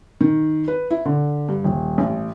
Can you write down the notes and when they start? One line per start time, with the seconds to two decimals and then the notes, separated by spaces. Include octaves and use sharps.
0.21 D#3
0.68 B4
0.91 E4
1.05 D3
1.49 G2
1.64 D#1
1.98 A1